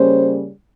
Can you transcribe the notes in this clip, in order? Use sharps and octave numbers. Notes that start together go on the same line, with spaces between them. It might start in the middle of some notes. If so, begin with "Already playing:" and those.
Already playing: C#3 G3 A#3 C#4 C5